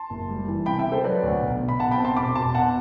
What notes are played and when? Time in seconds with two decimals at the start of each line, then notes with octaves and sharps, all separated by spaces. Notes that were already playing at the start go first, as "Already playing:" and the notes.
Already playing: A5 C6
0.10 F#1
0.29 G3
0.48 E3
0.66 C3 G5 B5
0.79 E5 G5
0.85 C3
0.92 A4 C5
1.04 F#3 B4 D5
1.23 D2
1.41 B1
1.61 B2
1.69 B5
1.79 B1 F#5 A5
1.91 G5 B5
1.98 C4
2.04 A5 C6
2.17 E1 B5 D6
2.35 E1 A5 C6
2.54 B2 F#5 A5